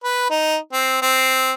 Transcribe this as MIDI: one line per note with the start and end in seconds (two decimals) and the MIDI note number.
0.04 0.29 71
0.30 0.57 63
0.73 0.99 60
1.02 1.53 60